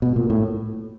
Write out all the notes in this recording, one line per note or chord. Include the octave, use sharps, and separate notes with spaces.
B2
A#2
A2